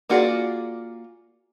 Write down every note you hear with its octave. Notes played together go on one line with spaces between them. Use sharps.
A#3 F4 F#4 G#4 D5